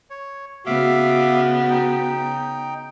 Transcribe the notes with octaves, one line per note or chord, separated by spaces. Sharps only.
C#5
C#3 B3 F#4 E5 F5 D6
D#4 G5